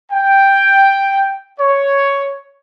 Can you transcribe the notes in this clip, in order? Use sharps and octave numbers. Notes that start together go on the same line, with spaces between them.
G5
C#5